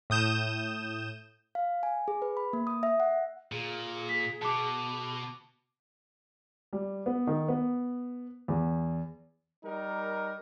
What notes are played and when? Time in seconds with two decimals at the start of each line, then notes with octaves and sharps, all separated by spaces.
0.10 A2 D#6 G6 E7
1.55 F5
1.83 G#5
2.08 G#4
2.22 B4
2.37 B5
2.53 A#3
2.67 D#6
2.83 E5
3.00 F#5
3.52 A#2 G#4
4.09 B6
4.42 B2 A5 D6
6.73 G3
7.06 B3
7.27 D#3
7.48 B3
8.48 E2
9.65 G3 D#4 A#4